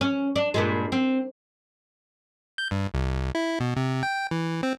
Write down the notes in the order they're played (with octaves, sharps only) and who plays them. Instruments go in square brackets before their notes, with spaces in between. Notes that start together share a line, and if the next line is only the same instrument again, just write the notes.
[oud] C#4
D4
G2 A#2 G#3
C4
[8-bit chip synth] G6
G2
C2
E4
B2
C3
G5
E3
C4